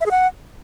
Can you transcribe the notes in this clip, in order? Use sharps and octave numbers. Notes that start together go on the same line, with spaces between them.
E5
G#4
F#5